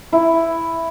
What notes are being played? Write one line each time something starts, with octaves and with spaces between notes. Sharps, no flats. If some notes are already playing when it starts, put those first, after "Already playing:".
E4